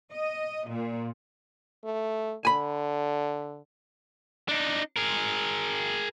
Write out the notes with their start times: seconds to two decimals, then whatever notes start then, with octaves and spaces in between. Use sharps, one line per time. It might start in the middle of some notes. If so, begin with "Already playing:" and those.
0.12 D#5
0.69 A#2
1.84 A3
2.45 D3 G#5 B5
4.49 D4 D#4
4.96 G#4 A#4